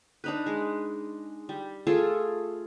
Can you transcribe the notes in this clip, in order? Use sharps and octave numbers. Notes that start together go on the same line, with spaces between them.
D4 D#4 B4
G#3
G3
A3 F4 G#4 A4